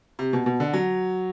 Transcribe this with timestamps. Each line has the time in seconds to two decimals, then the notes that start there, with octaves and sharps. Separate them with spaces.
0.19 C3
0.33 B2
0.46 B2
0.60 D3
0.73 F#3